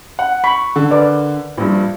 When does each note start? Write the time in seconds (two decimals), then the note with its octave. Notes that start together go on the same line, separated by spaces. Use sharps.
0.19 F#5
0.44 B5 C#6
0.76 D3
0.91 A#4 B4 D5
1.58 A#1 G2